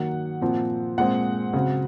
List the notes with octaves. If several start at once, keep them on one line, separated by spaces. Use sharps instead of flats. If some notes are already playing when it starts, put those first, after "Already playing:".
Already playing: D#3 F#3 A#3 F#5
A#2 F3 C4
A#2 G#3 C4 F#5
C#3 F#3 C4